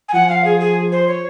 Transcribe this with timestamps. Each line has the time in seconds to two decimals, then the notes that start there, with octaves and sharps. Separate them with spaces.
0.08 G#5
0.13 F3 F#5
0.29 F5
0.44 G#4
0.60 G#4
0.92 C5
1.07 C#5